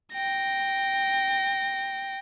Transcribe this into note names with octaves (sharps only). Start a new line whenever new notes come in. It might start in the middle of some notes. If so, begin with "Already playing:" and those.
G5 A#6